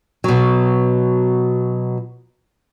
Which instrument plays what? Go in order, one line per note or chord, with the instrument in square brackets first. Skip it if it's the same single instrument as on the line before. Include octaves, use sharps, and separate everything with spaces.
[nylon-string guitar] B2 F#3